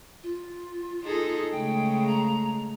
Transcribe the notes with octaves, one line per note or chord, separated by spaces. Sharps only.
F4
D#4 G#4 A4
C#3 G#3 A3 G5
A#5